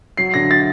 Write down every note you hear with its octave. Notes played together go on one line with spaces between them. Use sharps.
F#3 C7
D3 A#6
F#3 A6